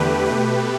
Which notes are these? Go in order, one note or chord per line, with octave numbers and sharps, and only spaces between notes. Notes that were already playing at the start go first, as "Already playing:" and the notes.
Already playing: E2 D3 A3 G4 B4
B2 A3 G4 B4